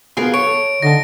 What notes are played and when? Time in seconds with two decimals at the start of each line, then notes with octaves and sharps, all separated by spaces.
0.17 B2 B3 F4 G#4 A#4
0.34 B3 C#5 D7
0.47 A4
0.82 D3 D#4 A5 A#6